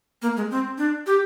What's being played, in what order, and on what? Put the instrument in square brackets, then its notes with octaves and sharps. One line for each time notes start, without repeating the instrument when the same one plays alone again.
[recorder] A#3
G#3
C4
D4
G4